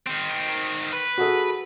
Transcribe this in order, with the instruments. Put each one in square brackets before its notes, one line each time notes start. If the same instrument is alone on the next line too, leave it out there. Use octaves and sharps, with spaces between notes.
[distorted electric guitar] D#3 C4
B4
[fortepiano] F#4 G#4 A4